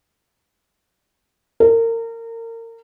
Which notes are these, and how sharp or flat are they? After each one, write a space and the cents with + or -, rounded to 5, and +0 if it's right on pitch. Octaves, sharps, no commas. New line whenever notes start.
A#4 -30